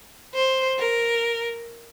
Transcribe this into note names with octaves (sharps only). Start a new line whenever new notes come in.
C5
A#4